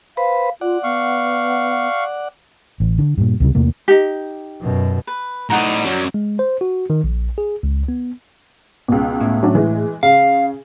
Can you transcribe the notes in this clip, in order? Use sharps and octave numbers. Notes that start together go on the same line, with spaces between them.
B4 C5 F5 B5
F4 D5 F#5
B3 F5 C#6
A1
D3
G2 A#2
C#2 C3 G3
E2 C3 A3 A#3
D#4 G4
F#2 B2
B4
A2 D#4 D5 F#5 A#5
F#2 F#3
G#3
C5
F#4
D#3
A#1
G#4
C#2
B3
C#2 B2
A2
F#3 C#4 D4
E3 G#3
C#3 F5